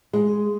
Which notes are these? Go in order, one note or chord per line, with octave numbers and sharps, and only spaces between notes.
G#3